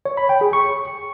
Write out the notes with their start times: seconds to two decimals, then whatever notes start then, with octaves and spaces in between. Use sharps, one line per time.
0.05 C#5
0.17 B5
0.29 G5
0.41 G#4
0.53 C#6